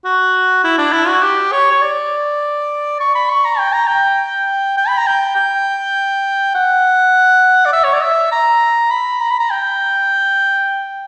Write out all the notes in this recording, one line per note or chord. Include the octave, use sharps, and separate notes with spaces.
F#4
E4
D4
E4
F#4
G4
C#5
C#5
D5
C#6
B5
C#6
A#5
G5
A#5
G5
G5
B5
A#5
G5
G5
F#5
D5
E5
C#5
D5
E5
A#5
B5
A#5
B5
A#5
G5